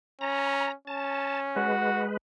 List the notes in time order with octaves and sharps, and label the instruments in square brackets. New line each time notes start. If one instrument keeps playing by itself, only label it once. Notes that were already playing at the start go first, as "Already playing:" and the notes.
[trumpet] C#4 [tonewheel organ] A#5
[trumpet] C#4 [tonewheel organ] A5
[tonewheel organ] G#3 B4 [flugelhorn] F#4